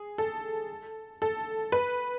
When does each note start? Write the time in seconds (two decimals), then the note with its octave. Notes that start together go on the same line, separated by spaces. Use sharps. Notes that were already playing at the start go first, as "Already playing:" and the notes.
Already playing: G#4
0.18 A4
1.22 A4
1.72 B4